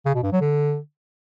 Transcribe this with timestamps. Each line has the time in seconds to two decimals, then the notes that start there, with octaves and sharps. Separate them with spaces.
0.06 C#3
0.14 B2
0.23 G2
0.32 F#3
0.41 D3